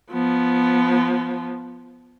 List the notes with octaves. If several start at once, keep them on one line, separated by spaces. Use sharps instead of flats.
F3 B3